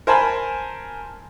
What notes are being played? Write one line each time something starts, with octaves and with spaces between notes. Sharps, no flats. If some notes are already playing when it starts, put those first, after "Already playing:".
A#4 C5 G#5 A5 B5